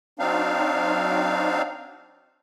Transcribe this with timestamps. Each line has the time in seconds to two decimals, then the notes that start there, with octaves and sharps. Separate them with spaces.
0.19 F#3 C4 D4 D#4 F5